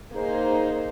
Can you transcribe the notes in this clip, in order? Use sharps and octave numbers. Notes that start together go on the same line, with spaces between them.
A#3 D#4 G#4 C5